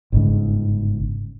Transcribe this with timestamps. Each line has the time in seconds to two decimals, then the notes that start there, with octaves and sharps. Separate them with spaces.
0.12 G1 G#2 C#3